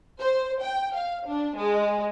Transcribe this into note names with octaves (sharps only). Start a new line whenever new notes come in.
C5
G5
F5
D4
G#3